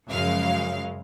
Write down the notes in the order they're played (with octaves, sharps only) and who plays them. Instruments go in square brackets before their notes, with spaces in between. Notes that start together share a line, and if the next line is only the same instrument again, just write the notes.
[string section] F#2 C#3 F3 G#3 F5